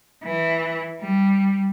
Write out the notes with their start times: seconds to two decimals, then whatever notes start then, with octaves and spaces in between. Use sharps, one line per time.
0.24 E3
1.01 G3